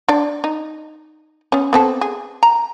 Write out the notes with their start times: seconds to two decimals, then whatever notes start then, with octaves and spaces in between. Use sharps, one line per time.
0.08 D4 D5
0.44 D#4
1.52 B3 C#4
1.73 B3 C4 A4
2.01 G#4
2.43 A#5